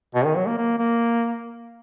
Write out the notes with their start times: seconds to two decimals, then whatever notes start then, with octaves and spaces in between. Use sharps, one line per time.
0.15 B2
0.25 D#3
0.36 F#3
0.46 A#3
0.57 A#3
0.78 A#3